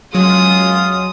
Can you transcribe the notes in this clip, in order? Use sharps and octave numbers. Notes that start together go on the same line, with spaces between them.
F#2 F#3 G#3 F4 D#6